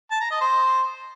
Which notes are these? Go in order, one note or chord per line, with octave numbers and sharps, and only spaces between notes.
A5
A#5
D#5
C5